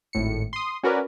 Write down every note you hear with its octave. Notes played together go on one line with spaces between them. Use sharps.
G#1 A2 C#7
C6 D#6
C#4 F#4 A#4 B4 D5